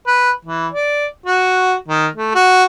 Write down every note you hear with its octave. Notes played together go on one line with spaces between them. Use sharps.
B4
E3
D5
F#4
D#3
A3
F#4